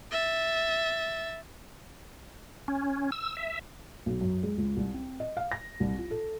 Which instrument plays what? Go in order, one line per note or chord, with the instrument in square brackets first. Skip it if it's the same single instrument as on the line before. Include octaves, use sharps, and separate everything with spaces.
[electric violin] E5 A6
[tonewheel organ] C#4
E6
E5
[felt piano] B1
F#2
G#3
C#2
C2
C4
D#5
F5
A#6
C2
F4
A4